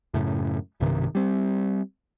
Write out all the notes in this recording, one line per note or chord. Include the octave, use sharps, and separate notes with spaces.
F#2 A2 C#3
B1 G2 C3 D#3
G3 C4